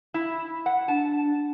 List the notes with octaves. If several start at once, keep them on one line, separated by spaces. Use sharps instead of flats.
E4
F#5
D4 A5